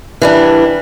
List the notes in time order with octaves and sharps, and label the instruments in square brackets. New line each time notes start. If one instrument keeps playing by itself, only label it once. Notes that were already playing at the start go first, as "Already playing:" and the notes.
[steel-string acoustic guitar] E3 G3 D4